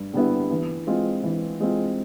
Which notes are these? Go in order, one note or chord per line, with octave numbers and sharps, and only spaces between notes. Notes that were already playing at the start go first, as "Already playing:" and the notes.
Already playing: G2
D3 G3 B3 E4
E3
G#3 C4 F4
E3
G#3 C4 F4